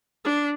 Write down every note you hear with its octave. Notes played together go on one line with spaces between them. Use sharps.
D4